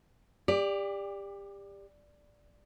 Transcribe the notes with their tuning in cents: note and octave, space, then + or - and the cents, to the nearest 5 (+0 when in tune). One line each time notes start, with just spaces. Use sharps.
G4 +30 D5 +0